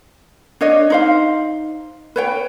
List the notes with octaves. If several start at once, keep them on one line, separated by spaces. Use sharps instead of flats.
D4 C#5 D#5
D#4 C5 F5
B4 C#5 G5